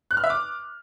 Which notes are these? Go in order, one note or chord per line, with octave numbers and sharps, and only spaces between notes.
F#6
F6
E5
D6